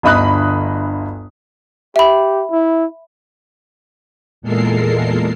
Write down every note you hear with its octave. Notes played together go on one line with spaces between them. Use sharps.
G1 D2 D#5 B5 D#6 F#6
G4 E5 B5
E4
E2 A#2 G#3 A4 A#4 C7